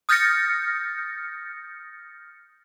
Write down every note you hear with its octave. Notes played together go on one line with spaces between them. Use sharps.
D#6 F6 G6 A6 A#6 C#7